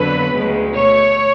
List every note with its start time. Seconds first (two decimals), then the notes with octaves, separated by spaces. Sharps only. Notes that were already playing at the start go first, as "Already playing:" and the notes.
Already playing: F2 D3 F#3 B3 B4
0.33 D2 C#3 G#3
0.76 B2 A3 C#5